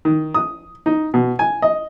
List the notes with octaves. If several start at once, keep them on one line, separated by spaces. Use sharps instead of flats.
D#3
D#6
D#4
B2
G#5
D#5